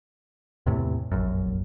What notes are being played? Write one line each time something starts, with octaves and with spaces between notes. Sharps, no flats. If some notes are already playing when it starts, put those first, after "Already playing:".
E2 A2 C3
F1 A#1 F#2